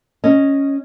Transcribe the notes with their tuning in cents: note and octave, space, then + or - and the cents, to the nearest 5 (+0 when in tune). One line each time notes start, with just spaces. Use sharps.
C#4 +0 D#5 +0